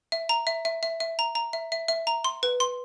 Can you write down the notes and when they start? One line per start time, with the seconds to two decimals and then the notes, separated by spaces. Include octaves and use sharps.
0.12 E5
0.29 A#5
0.47 E5
0.65 E5
0.83 E5
1.00 E5
1.19 A#5
1.35 A#5
1.53 E5
1.72 E5
1.88 E5
2.07 A#5
2.24 C6
2.43 B4
2.60 C6